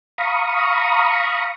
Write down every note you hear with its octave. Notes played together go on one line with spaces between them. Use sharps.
F5 A#5 B5 C#6 D#6